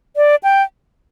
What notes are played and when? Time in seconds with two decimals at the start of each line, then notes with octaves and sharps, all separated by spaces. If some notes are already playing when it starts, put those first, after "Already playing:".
0.16 D5
0.43 G5